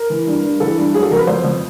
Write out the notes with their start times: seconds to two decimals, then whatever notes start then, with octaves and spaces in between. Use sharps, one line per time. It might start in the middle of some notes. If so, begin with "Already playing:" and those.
Already playing: A#4
0.10 E3
0.27 G2
0.43 G2
0.60 E3 A4
0.78 G2
0.94 F#3 G#4
1.03 A4
1.11 F2 A#4
1.19 B4
1.27 F2 C5
1.45 F2